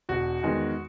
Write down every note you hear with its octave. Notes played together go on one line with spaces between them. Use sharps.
E1 F#4
E2 D#3 G#3